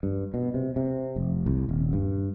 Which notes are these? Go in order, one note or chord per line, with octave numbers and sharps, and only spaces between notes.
G2
B2
C3
C3
F1
C2
D#1
G2